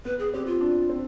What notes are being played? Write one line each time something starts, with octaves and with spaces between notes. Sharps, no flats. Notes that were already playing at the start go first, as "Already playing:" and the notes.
B3 B4
G#4
C4 G4
F4
D4
C4